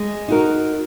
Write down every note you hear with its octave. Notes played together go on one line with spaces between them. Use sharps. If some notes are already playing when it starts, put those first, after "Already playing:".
Already playing: G#3
D#4 F#4 A#4